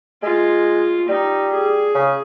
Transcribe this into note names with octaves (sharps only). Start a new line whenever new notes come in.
G#3 F4
G3 D#4
G#4
C#3